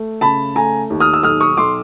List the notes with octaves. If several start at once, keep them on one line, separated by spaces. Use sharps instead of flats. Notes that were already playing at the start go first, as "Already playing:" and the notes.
Already playing: A3
C#3 A5 B5
A3 G#5 A#5
D#2
D#6 F6
E6
B1 D#6 F6
C#6 D#6
B1 C6 D6